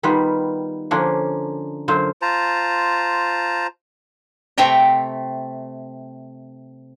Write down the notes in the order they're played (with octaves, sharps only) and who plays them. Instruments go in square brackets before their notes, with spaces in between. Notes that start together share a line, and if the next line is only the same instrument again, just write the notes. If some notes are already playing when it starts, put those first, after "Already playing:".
[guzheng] D#3 G3 B3 F4 B4
D3 F3 A#3 C#4 D4
F#2 D3 F4 C5 F5
[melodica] F4 C5 A5 A#5
[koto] C3 A3 E5 G5 A#5